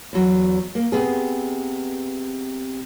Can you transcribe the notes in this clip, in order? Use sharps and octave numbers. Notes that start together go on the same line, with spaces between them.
E2 F#3
A#3
C3 B3 G#4